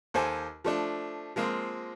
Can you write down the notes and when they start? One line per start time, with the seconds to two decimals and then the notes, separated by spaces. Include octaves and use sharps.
0.14 D#2 A4 C5 G#5 D6
0.64 F3 A3 D4
1.36 F3 G#3 A#3 C4 F4